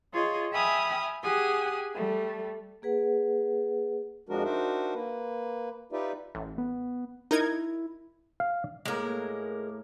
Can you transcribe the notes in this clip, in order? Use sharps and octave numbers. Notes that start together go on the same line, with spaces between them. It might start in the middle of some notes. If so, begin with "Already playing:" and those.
F4 G#4 C#5 D#5
E5 G5 G#5 B5 D#6 F6
G4 G#4 F#5 G#5 D#6
G3 A3
A#3 G#4 B4 F#5
F2 F3 G#3 D4 F#4 A#4
D4 D#4 F#4 A#4 C5 E5
A#3 B4
D#4 F4 G4 B4 D5 E5
A1
B3
D#4 E4 A#4 G#6
F5
A2 G#3 A#3 A#4